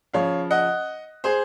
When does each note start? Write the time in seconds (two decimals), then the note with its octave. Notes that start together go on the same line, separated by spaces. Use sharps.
0.14 C#3 F3 C#5 F5
0.51 D#5 F#5
1.24 G#4 C5